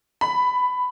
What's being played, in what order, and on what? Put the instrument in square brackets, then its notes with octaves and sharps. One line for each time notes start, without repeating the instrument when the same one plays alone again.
[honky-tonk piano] B5